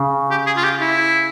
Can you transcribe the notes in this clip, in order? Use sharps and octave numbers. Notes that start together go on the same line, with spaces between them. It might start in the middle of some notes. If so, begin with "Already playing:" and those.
Already playing: C#3
G4
G#4
F4
G4
E4